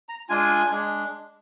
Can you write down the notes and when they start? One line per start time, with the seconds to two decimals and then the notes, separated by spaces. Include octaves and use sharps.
0.09 A#5
0.29 G#3 D4 F4 G#5
0.71 G#3 D4